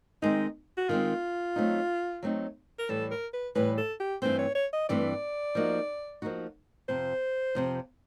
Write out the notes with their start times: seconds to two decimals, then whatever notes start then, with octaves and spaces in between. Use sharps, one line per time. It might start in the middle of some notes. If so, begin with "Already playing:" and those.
0.22 D#3 G#3 C4 D#4
0.77 F#4
0.89 D#3 G#3 C4 F4
1.56 F#3 A3 C4 D#4
2.23 F#3 A3 C4 D#4
2.79 A#4
2.89 A2 E3 G3 A4
3.11 A#4
3.33 B4
3.55 A2 E3 G3 B4
3.78 A4
4.00 G4
4.22 G2 E3 A3 C4 C5
4.39 C#5
4.55 C#5
4.73 D#5
4.89 G2 E3 A3 C4 D5
5.55 F3 A#3 D#4 F#4
6.22 F3 A#3 D#4 F#4
6.89 F2 C3 F3 C5
7.55 F2 C3 F3